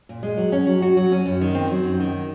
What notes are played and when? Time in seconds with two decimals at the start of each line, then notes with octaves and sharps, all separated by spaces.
0.09 A#2
0.23 G#3
0.38 F#3
0.52 C#4
0.67 F#3
0.82 F#4
0.97 F#3
1.12 C#4
1.26 F#2
1.41 D#3
1.55 C4
1.71 F#3
1.84 F#2
2.00 D#3